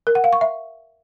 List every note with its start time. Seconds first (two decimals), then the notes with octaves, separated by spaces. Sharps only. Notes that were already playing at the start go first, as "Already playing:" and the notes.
0.07 A#4
0.15 F#5
0.24 F5
0.33 C#6
0.41 E5